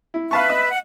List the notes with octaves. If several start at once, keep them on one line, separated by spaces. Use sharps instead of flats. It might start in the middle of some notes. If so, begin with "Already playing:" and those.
E4
B4 E5 F5 A5 C#6
D#5
F#5